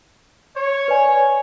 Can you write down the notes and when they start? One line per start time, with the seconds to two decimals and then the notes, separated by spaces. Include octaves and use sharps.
0.55 C#5
0.88 B4 D5 G#5